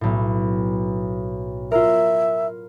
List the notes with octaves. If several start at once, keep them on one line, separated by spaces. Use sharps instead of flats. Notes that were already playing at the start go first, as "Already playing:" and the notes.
B1 A2
F4 A#4 E5